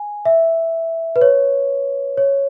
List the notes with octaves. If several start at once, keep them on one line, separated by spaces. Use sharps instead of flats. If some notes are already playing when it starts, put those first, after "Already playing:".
Already playing: G#5
E5
B4
C#5
C#5